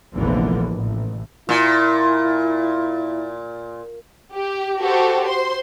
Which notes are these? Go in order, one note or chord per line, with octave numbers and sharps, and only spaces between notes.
F1 A#1 D3 E3 A#3 B3
A1
A#2 E4
G4
F#4 G4 A4 C5
C5 C6